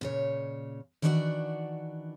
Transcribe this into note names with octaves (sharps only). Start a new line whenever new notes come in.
A#2 C#3 C#5
D#3 E3 D4 F#4 D5 F#5